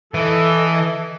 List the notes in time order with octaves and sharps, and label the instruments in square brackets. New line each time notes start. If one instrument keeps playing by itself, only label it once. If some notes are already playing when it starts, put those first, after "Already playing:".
[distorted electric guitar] E3 [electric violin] A4 D#5